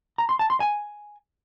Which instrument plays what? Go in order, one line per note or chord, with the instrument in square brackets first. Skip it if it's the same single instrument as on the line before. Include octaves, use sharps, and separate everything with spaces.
[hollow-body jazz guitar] A#5
C6
A5
C6
G#5